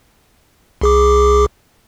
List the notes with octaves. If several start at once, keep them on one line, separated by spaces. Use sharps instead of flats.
C2 G#4 D6